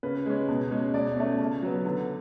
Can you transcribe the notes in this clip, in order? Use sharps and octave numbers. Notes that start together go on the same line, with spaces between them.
C#3 B4
G#3 C#4
B2
G#3 C#4
B2 D5
A3 C#4
C#3
F#3 B3
D3